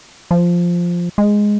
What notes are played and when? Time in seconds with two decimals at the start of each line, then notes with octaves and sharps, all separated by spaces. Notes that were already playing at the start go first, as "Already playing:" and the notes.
0.31 F3
1.18 G#3